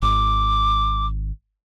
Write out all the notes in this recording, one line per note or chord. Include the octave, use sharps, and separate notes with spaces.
G#1 D6